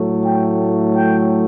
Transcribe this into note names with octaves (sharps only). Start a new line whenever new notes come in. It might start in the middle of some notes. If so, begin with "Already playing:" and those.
Already playing: A2 F#3 A3
G5
G5